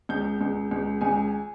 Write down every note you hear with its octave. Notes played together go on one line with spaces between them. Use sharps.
C#2 G6
C#2
C#2
C#2 G#5